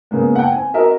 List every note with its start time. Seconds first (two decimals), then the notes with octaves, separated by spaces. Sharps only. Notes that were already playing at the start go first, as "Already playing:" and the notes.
0.11 C#3 G#3 A#3 B3
0.36 F#5 G5
0.52 C4 G#5
0.74 C4 F#4 A#4 D#5 E5